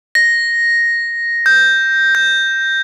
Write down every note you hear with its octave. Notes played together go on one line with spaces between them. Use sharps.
A#6
G6
G6